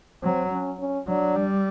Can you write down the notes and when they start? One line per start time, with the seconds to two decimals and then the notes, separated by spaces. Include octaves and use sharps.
0.22 F#3 C4
0.51 C#4
0.80 C#4
1.08 F#3 D4
1.36 G3